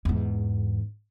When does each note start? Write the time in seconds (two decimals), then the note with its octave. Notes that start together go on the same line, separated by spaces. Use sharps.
0.05 E2 G#2